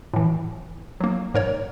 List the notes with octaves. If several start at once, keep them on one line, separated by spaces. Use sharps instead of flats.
A2 E3
F#3 A#3
G#2 A#4 C#5